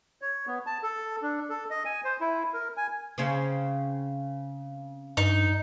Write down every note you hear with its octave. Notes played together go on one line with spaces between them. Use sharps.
C#5
B3
A5
A4
D4
A4
D#5
G#5
C5
E4
A#4
G#5
C#3 C4 C#4
G2 D#4